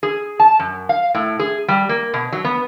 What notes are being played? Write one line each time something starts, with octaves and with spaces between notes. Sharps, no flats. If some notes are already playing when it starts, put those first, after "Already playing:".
G#4
A5
F#2
F5
A2
G#4
G3
A#3
B2
F#3
B3